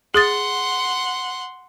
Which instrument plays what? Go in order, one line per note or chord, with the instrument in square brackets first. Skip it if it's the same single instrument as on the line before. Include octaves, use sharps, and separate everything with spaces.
[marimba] G#4 D#6 A6 [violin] F#5 C6